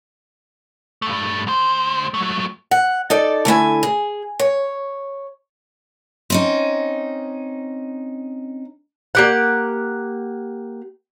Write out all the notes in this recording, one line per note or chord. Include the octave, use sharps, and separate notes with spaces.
G2 A3
D2 C5
F#3 A3
F#5
D#4 A4 D5
D3 A3 E4 G#5
G#4
C#5
C4 C#4 D#4
A#3 G4 F#5